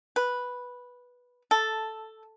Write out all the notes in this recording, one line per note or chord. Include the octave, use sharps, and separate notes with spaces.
B4
A4